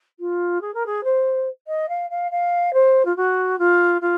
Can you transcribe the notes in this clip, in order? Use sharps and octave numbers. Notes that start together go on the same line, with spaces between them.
F4
G#4
A#4
G#4
C5
D#5
F5
F5
F5
C5
F4
F#4
F4
F4